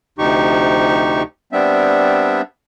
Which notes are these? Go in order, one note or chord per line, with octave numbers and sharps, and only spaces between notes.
D2 C3 F3 D#4 G4 C#6
G3 B3 C4 D4 E5